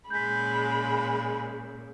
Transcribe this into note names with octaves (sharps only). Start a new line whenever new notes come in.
A#2 C#3 G#3 B5 G6 B6